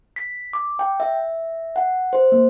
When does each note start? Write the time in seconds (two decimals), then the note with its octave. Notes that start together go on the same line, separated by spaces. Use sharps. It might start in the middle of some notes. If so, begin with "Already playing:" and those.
0.16 B6
0.53 D6
0.79 G5
1.00 E5
1.76 F#5
2.13 C5
2.32 A#3